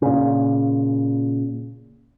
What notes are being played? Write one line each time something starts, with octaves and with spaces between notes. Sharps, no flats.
A#2 C#3